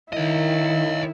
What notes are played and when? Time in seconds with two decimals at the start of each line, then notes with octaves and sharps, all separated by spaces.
0.13 D#3 E4 C#5 D#5